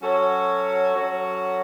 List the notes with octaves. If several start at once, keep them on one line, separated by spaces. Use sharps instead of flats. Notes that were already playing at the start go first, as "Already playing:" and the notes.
F#3 C#4 F#4 A4 C#5
F#3 C#4 F#4 A4 C#5